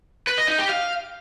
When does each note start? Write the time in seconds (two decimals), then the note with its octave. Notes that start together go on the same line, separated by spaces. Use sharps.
0.27 B4
0.38 D#5
0.48 D#4
0.59 G4
0.69 F5